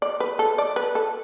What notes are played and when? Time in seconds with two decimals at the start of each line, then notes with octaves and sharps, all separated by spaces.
0.02 D5
0.20 B4
0.39 A4
0.58 D5
0.76 B4
0.95 A4